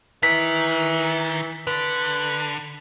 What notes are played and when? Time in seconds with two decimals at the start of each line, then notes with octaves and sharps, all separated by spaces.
0.23 D#3 E3 B6
1.67 D3 B4